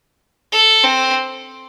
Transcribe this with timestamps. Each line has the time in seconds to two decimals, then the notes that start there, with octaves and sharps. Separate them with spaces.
0.52 A4
0.84 C4